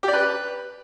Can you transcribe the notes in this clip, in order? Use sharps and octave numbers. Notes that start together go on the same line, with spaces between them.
G4
D5
B4